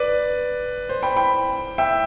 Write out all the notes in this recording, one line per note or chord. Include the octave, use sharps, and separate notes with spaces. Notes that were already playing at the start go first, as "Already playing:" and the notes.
Already playing: B4 D5
C5
G5 B5
G5 B5
E5 G5